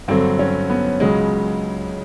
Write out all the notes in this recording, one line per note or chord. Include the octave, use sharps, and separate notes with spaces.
G2 D3 F#3 C4
C#4
B3
C#2 C#3 F#3 G#3